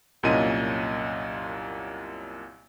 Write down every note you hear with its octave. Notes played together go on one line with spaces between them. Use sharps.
C2 F#2 A#2 C#4 D#5 D#7